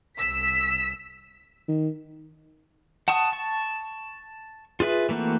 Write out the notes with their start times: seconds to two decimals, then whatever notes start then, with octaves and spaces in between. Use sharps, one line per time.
0.19 C2 E6 B6
1.68 D#3
3.08 F#5 A5 C#6 D#6
3.32 A5 C#6
4.80 F4 G#4 B4 E5
5.09 E3 A3 A#3 C4 F#4